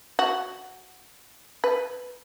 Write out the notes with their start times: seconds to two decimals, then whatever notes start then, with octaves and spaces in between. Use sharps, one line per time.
0.19 F#4
1.64 B4